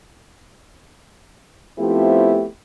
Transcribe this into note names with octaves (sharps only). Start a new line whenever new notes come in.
F3 A3 B3 C4 E4 G4